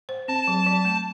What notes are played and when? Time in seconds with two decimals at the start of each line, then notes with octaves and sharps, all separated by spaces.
0.09 C5
0.28 C4 A5
0.47 F#3
0.67 F#3
0.85 A3